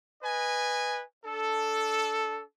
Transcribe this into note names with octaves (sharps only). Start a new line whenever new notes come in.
B4 D#5 G#5
D4 A4